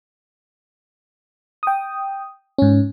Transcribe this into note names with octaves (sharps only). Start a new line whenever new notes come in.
G5 D#6
G#2 C#4